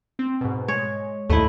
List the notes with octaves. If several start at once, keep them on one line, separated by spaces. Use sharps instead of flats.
C4
G#2 B2
G#3 C#5
D#2 G#2 A3 E4 D#5